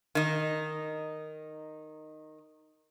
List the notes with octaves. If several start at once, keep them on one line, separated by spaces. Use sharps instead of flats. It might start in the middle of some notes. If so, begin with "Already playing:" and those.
D#3 D#4